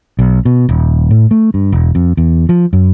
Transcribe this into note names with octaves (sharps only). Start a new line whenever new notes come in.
B1
B2
D#1
A2
A3
G2
E1
F2
E2
F3
F#2